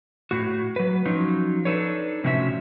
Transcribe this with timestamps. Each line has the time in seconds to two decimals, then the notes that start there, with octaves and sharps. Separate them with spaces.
0.31 A2 F#4
0.76 F#3 B4
1.05 F3 F#3 C#4 D#4
1.65 D4 D#4 A4 B4 C#5
2.24 A2 C3 F3 C#4 F#4 E5